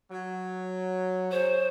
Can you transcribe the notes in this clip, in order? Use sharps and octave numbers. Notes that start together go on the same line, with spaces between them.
F#3
F#4 G#4 C5 C#5